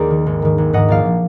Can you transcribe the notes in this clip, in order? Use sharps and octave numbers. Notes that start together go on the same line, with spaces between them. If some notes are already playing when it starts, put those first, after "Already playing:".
Already playing: D#2 G#4 A#4 D5
D#3
G#1
G#2 D#3
G#1
G#2 D#3 D#5 F#5
A#1 D5 F5
F3